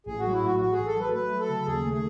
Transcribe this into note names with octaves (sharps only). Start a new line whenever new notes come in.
A1 G#4
F#4
F#3
E4
A2 F#4
A1 F#4
G#4
A1
A4
F#3
B4
A3 B4
F#3
A4
C#3
D#2 G#4
A3
G#4